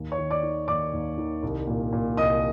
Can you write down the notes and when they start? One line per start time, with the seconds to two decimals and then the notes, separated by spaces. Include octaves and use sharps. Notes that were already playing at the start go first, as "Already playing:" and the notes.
Already playing: D#2
0.12 C#5 C#6
0.18 D#3
0.31 D5 D6
0.43 D#3
0.68 D#2 D5 D6
0.93 D#2
1.18 D#3
1.43 C2
1.67 A#2
1.93 A#2
2.17 C2 D#5 D#6